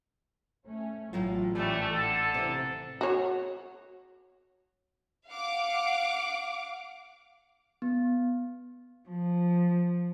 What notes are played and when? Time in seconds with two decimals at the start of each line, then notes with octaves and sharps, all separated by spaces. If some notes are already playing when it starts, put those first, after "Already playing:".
0.67 A3 C#4
1.13 A1 A2 F#3 F4
1.55 G#2 G3 A3 D5 G#5
1.91 D3 A4
2.34 C3 E3
3.01 F#4 C#5
5.29 F5 F#5 D6
7.82 B3
9.09 F3